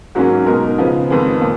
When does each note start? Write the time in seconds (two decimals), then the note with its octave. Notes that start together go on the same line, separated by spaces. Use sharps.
0.15 G#2 F#3 A#3 C#4
0.46 B2 G#3 D#4 A#4
0.78 C#3 F3 B3
1.10 F2 D#3 G#3 B3
1.42 A#2